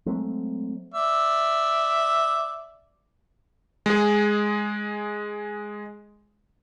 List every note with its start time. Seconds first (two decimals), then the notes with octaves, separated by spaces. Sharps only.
0.06 F#3 G#3 A3 C4
0.94 D5 E5
3.86 G#3 G#4